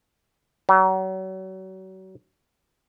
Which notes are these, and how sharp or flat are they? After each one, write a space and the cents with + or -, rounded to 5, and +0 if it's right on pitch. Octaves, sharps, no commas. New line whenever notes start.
F#3 +35